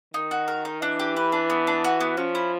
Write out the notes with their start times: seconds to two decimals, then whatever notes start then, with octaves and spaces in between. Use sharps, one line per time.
0.14 D#3 D#4
0.31 F#4
0.48 A#4
0.65 D#4
0.82 E3 D4
0.99 G4
1.17 B4
1.32 D4
1.50 B3
1.67 D4
1.84 F#4
2.00 B3
2.17 F3 C#4
2.35 E4